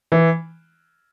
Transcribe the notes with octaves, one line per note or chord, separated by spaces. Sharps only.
E3